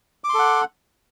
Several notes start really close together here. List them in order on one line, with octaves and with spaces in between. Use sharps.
D6 C6 A4 F#5